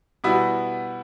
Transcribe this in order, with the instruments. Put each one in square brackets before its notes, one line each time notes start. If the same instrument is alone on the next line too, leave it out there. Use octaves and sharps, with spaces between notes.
[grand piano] B2 G3 B3 E4